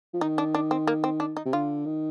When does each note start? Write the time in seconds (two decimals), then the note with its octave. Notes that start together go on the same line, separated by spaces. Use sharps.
0.14 F3
0.21 D#3 D#4
0.38 D4
0.55 D4
0.71 C4
0.87 A#3
1.04 C4
1.20 D4
1.37 D#4
1.46 C3
1.53 D3 F4
1.86 D#3